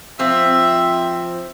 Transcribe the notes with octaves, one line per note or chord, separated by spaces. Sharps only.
F3 C4 F4 E5